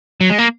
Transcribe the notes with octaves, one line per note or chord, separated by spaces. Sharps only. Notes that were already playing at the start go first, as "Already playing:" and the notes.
F#3
G#3
A#3